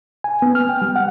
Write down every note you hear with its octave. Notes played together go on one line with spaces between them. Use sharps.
G#5
B3
F6
G5
G3
F#5